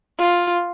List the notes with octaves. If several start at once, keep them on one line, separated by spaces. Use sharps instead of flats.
F4